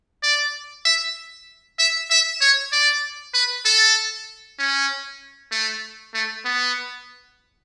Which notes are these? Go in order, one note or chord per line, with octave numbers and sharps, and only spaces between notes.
D5
E5
E5
E5
C#5
D5
B4
A4
C#4
A3
A3
B3